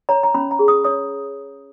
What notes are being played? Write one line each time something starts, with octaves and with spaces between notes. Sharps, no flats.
C#5 A#5
A#5
C#4 B5
A#5
G#4
D#6
C#5 D#6